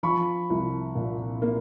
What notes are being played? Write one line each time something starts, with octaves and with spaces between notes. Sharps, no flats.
F3 B5 C#6
C2
A#2
A#3